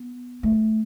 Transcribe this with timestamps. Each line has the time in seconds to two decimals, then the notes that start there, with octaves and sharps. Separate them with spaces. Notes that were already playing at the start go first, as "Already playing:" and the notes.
Already playing: B3
0.43 A3